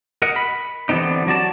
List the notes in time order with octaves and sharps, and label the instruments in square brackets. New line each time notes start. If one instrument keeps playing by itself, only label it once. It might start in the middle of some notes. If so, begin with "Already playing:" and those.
[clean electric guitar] A#4 D#5 F#5
B5
D3 E3 G3 B3 C4 D#4
F#3 F#4 D5 A5